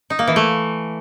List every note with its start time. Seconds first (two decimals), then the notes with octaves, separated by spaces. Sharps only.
0.10 D#4
0.19 A#3
0.27 E3
0.36 A3